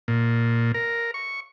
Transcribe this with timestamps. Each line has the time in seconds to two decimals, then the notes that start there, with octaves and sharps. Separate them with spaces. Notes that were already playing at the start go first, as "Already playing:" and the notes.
0.08 A#2
0.74 A#4
1.14 C#6